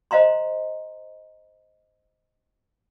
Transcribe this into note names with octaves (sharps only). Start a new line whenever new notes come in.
C5 D#5 F5 A#5 C6